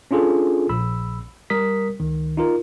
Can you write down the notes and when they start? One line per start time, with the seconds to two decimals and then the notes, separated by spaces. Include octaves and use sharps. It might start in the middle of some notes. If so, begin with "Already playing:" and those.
0.11 C#4 D4 F4 G#4 A4
0.69 A#1 B5 E6
1.50 G3 A#4 D#6 B6
2.00 C#2 D#3
2.37 D#4 F4 A#4